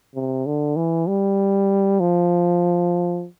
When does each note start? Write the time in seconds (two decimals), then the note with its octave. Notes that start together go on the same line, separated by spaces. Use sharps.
0.15 C3
0.46 D3
0.76 E3
1.08 G3
2.00 F3